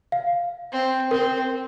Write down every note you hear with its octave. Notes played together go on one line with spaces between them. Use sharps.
F5
C4
C4 A#4